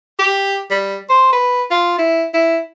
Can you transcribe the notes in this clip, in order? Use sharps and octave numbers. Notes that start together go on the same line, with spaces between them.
G4
G3
C5
B4
F4
E4
E4